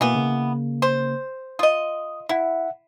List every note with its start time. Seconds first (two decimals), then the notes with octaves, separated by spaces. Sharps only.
0.01 B2 E3 A#3 B3
0.15 C#3 A#3
0.82 C5
1.59 F4 D#5 D#6
2.29 E4 E5 F#5